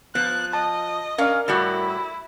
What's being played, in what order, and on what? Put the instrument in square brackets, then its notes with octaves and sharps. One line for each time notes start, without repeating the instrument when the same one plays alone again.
[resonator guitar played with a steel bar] F3 [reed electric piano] B3 [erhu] F#6
[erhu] D#5 [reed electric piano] A5
[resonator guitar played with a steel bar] C#4 F5 [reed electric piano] A#4 D5
[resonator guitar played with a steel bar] A2 G3 F#4 [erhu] E4